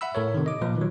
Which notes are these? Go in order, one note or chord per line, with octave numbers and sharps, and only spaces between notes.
E5 F#5 B5 E6
A2 A4 A#4 C#5
C3 D#3
D#5 D6
A#2 F3 B4
D#3 F#3